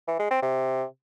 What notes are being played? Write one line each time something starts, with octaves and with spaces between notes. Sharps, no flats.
E3
G#3
C4
C3